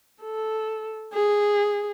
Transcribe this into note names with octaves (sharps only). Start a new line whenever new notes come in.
A4
G#4